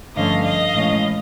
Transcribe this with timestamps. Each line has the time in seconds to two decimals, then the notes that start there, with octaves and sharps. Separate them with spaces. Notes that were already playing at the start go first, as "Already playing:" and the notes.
0.16 G2 D3 F3 A3 C#4 D#5 F5
0.45 D#5 F5
0.74 A2 E3 G#3 C#4